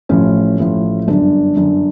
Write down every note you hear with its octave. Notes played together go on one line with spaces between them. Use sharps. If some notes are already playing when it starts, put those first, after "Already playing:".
A1 A2 F3 C#4
A1 A2 F3
G1 F#2 D3 F#3 D4
G1 F#2 D3 F#3